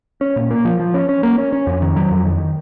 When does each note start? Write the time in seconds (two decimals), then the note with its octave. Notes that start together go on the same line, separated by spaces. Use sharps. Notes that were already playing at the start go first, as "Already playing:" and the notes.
0.21 C#4
0.36 A#2
0.51 A#3
0.65 F3
0.80 F3
0.94 C#4
1.09 C#4
1.23 A#3
1.38 C#4
1.53 C#4
1.67 F2
1.82 D#3
1.96 F#3
2.11 F2
2.25 D#3